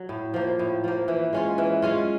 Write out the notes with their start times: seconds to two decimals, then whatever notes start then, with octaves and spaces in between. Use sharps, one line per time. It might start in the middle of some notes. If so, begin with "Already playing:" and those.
Already playing: F#3
0.09 A2
0.34 F3 A#3
0.59 A2
0.84 F3 A#3
1.08 E3
1.33 G#3 C#4 F4
1.58 E3
1.82 G#3 C#4 F4